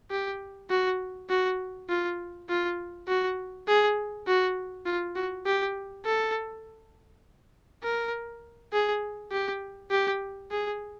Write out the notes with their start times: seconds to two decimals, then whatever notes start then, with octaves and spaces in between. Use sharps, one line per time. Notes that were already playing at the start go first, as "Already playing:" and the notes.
0.11 G4
0.70 F#4
1.30 F#4
1.89 F4
2.49 F4
3.08 F#4
3.68 G#4
4.27 F#4
4.86 F4
5.16 F#4
5.46 G4
6.06 A4
7.83 A#4
8.73 G#4
9.32 G4
9.91 G4
10.51 G#4